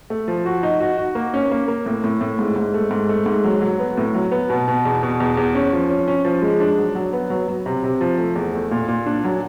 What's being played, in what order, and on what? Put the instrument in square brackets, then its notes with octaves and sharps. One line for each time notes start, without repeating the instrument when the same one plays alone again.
[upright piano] A3
F3
F#4
D#4
F#4
F#4
A#3
C#4
A#3
A#3
A2
A2
A2
G#2
G#2
A3
G#2
A3
G#2
F#3
F#3
B3
A2
F#3
B3
B2
B2
E2
B2
E2
E2
C#4
F3
C#4
C#4
F3
G#3
D4
F#3
F#3
B3
F#3
F#3
C3
C3
F3
A3
E2
A3
A#2
A#2
D4
F#3